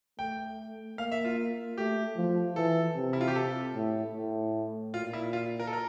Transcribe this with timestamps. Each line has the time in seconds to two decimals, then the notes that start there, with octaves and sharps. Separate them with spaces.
0.19 A3 G5
0.98 A#3 F5
1.12 E5
1.25 F4
1.78 A3 G4
2.17 F3
2.56 E3 A4
2.96 C3
3.13 E4
3.21 F4
3.28 G4
3.35 A4
3.75 A2
4.14 A2
4.94 A#2 F4
5.13 E4
5.33 F4
5.60 A#4
5.67 A4
5.73 A#4